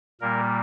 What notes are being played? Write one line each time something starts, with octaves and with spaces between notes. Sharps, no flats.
A#2 G3 A#3 A#4